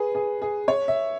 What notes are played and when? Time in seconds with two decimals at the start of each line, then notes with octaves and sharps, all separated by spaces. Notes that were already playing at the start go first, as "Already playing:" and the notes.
Already playing: G#4 B4
0.15 G#4
0.42 G#4
0.68 C#5
0.88 E5